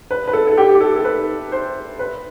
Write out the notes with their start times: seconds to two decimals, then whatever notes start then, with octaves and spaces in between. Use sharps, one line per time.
0.11 B4
0.28 B4
0.33 A4
0.47 A4
0.58 G4
0.74 G4
0.81 A4
0.96 A4
1.05 B4
1.52 C5
1.99 B4